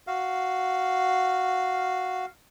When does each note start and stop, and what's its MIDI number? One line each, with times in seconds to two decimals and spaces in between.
0.07 2.25 66
0.07 2.25 77